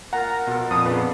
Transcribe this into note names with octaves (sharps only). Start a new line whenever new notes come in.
A#2 A#4 F#5 A#5
B2 F3 A4
F2 A#2 A5 D#6
C#3 B3 D4 F#5